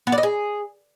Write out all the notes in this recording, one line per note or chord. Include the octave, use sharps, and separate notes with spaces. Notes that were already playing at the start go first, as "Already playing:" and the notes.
B3
D5
D#5
G#4